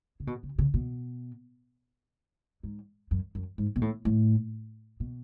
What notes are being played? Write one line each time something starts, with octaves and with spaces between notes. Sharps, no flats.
C#3
B2
C#3
C#3
B2
G#2
F#2
F#2
G#2
B2
A2
A2
B2